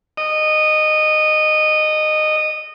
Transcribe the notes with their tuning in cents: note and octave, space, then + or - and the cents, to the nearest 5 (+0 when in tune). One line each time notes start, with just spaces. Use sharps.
D#5 -15